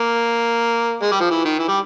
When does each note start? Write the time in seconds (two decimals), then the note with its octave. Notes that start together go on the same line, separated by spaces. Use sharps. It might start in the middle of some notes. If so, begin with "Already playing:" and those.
Already playing: A#3
1.02 G#3
1.12 G3
1.20 F3
1.31 E3
1.45 D#3
1.59 E3
1.68 G3